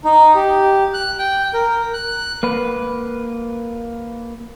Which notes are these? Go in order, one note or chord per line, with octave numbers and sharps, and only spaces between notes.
D#4
G4
F#6
G5
A#4
F#6
A#3 B4